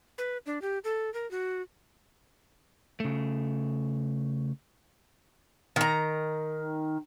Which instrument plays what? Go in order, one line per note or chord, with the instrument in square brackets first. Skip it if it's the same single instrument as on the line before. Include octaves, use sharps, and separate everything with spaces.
[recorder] B4
D4
G4
A4
A#4
F#4
[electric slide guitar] C#3 A3
[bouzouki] D#3 A#5